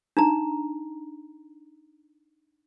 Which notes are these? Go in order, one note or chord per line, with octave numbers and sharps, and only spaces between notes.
D4 D#4 A#5